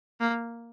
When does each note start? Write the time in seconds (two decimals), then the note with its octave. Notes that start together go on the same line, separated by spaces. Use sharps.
0.20 A#3